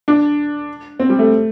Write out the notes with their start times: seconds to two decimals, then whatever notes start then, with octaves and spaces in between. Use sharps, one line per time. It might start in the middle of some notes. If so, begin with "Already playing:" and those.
0.08 D4
1.00 C4
1.09 G3
1.19 A3